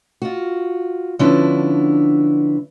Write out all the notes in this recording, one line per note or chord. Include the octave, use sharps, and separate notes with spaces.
F4 F#4
D3 F3 B3 C#4 D4 E4